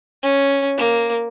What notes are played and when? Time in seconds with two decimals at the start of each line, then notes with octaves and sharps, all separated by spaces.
0.23 C#4
0.77 A#3